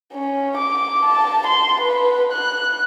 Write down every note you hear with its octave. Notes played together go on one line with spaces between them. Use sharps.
C#4
D6
A5
C6
B4
F#6